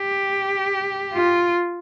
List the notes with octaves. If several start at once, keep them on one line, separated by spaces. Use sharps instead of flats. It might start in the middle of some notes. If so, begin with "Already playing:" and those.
Already playing: G4
F4